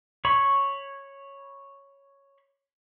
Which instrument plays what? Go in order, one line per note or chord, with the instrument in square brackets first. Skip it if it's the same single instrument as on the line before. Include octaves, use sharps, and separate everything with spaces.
[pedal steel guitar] C#5 B5 C#6